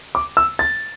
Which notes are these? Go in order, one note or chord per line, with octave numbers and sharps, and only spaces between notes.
D6
E6
A6